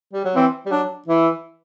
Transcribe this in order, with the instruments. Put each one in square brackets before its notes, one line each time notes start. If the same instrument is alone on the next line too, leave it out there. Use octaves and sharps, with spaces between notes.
[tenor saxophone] G3
F#3
[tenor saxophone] E3 [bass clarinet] C4
[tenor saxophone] G3
[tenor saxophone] F#3 [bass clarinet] D4
[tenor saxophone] E3 [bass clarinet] E4